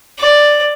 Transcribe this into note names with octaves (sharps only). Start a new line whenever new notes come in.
D5